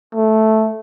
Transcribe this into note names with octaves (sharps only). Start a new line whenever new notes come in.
A3